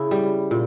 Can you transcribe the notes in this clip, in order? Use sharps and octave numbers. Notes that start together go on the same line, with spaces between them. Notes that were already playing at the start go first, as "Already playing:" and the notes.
Already playing: C#3 E4
G3
A#2